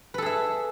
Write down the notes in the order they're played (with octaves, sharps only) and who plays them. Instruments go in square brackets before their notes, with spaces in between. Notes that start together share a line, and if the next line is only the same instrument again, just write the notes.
[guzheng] B4
A4
G#4
E5